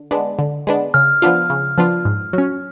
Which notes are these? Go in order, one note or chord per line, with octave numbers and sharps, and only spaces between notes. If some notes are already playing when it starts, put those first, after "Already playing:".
Already playing: D3
G#3 B3 D4
D3
G#3 B3 D4
C#3 F6
F3 B3 D4 F4
C#3
F3 B3 D4 F4
G#2
F#3 C#4